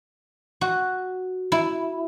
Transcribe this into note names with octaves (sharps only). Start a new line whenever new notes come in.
F#4
E4